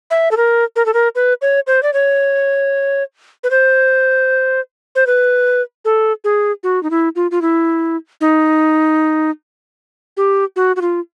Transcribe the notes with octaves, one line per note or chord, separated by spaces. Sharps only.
E5
A4
A#4
A#4
A4
A#4
B4
C#5
C5
D5
C#5
B4
C5
C5
B4
A4
G#4
F#4
D#4
E4
F4
F4
E4
D#4
G4
F#4
F#4
F4